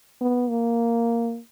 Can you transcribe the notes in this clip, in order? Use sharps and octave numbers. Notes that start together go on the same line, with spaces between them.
B3
A#3